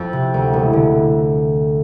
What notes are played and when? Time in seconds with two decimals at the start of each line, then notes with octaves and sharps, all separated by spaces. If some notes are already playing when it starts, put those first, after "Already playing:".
Already playing: F2
0.13 C3
0.34 D2
0.53 E1
0.73 D3